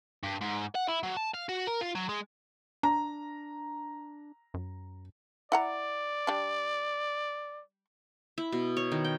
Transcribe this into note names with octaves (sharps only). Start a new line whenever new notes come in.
G2
G#2
F#5
E4
F#3
A5
F5
F#4
A#4
F4
F#3
G#3
D4 A#5
F#2
E4 D5 F#5 A#5
G3 D4
E4
B2
C#5
D#3
G5